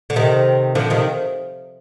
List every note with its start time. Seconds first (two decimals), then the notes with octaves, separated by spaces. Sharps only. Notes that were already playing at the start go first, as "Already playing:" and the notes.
0.10 D3
0.16 C3 D#3
0.75 D3 F3
0.90 C3 D#3